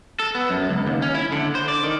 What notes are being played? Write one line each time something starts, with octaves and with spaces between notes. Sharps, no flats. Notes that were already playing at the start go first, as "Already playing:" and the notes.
A4
B3
F#2
C#2
D#2
C#4
E4
D3
C5
D5
D#3